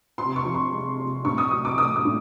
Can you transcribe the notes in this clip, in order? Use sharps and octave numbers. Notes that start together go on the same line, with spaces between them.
C3 C6
C#6
F3
C6
G#3
C3
A2 C#6
D#6
F#3 D#6
D6
A3 D#6
D#6
A2